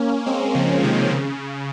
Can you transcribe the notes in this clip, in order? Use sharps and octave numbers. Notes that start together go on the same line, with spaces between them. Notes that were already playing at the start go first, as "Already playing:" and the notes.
Already playing: A#3 C#4
G#3 C4
C#3 F3
C3 D#3
C#3